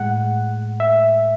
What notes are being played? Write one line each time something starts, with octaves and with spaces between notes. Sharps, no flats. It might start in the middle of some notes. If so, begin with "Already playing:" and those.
Already playing: A2 G#3 F#5
E5